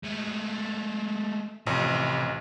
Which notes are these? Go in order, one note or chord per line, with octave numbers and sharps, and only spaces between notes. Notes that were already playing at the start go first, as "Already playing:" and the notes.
G#3 A3
A1 F2 C3